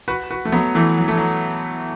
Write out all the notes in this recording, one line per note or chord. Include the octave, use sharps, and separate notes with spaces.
F#4 B4
F#4 B4
A3
F#3 B3
E3 A3
F#3
A3
F#3